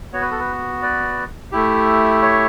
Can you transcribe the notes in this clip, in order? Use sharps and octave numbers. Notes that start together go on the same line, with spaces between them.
B3 F#4 C#5
B4
A4
B4
B4 D5
A3 E4 G4
C#5 E5